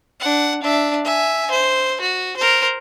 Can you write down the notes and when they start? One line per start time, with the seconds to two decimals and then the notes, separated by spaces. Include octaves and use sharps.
0.20 D4 F#5
0.62 D4 E5
1.05 E5 G#5
1.51 C5
2.01 F#4
2.37 A#4 C5